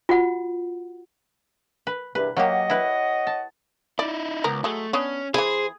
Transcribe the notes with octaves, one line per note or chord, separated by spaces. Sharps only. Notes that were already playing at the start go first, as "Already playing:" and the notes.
F4 F#4 F#5
B4
E2 G2 C3 B4
F#3 A#3 G4 C#5 D#5 F#5
E4 B4
A5
D#4 E4 D5
C#2 B3 A#4
F#3 G#3 A3
B3 C#4 D4 C#5
E3 E4 G#4 C5